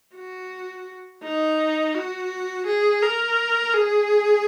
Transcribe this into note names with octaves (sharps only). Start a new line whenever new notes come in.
F#4
D#4
F#4
G#4
A#4
G#4